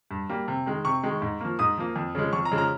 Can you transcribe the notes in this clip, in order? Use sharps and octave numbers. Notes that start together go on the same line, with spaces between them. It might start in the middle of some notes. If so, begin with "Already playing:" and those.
G2
G3 A#3
C3
D#3 G#3
C3 C#6
D#3 G#3
G#2
F3 A#3
G#2 D#6
F3 A#3
F2
C#3 F3 G#3
F2 C#6
A#5
C#3 F3 G#3
A#5